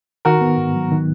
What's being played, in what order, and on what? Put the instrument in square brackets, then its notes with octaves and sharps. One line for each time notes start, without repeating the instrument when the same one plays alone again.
[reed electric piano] D#3 [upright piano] F#4 A#4
[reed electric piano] B3
G#2
F#3
D#3